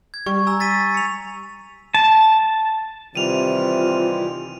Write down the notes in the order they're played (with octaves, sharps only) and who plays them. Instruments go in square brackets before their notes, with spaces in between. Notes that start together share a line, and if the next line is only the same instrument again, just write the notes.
[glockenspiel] G#6
[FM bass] G3 [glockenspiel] C#6
[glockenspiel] G#5 A#5 E6
A6 B6 D#7
C#7 F7
[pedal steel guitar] A5
[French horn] C3 [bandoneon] D#3 E3 G3 [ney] F4 [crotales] D#7 F7